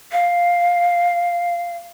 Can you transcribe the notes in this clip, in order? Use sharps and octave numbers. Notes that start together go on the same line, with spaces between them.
F5